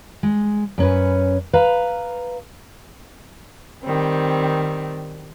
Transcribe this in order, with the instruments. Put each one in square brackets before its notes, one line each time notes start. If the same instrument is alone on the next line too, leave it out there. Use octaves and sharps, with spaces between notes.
[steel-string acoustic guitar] G#3
F#2 C#4 B4
B4 F5 A#5
[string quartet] D#3 G3 C4